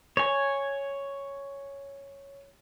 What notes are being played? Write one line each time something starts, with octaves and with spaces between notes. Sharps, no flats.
C#5 G#5